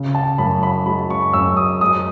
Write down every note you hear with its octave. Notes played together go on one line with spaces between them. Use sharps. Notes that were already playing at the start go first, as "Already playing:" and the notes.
Already playing: C#3
A5
F#2 B5
B5
G#3 B5
C#6
F#2 E6
D#6
G#3 D#6